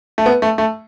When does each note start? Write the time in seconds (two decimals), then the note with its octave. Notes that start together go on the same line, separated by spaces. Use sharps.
0.18 A3
0.26 B3
0.42 A3
0.58 A3